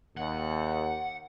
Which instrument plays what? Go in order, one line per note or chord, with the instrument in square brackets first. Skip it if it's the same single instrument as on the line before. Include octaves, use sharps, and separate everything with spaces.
[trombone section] D#2 [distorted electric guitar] F#5